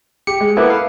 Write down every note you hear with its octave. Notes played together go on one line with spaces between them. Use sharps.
G4 C#7
G#3
A#3 B3 E4 A4 B4 D6
F5